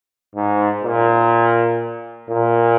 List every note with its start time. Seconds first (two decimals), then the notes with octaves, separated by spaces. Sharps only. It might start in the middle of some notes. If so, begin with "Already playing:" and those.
0.35 G#2
0.83 A#2
2.29 A#2